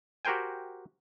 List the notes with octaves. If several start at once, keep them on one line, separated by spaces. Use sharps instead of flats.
F#4 G4 A#4 C5 G5 G#5